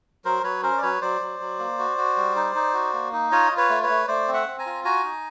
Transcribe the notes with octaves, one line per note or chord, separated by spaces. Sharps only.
F#3 A#4 C5
F#3 B4 C#5
C#4 A#4 C5
D5
F#3 B4 C#5
F#3 C5 D5
F#3
F#3
A#3
F#4
F#4
G3
D#4
D#4
F#4
A#3
D#4
F4 C#5 D#5
F4
B4 C#5
A3
B4 C#5
A3
A3 C5 D5
C4
E5 F#5
C4
G#5 A#5
F4
F#4 G#5 A#5
D#4